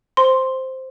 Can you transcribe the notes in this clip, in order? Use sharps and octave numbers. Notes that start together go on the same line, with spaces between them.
C5 C6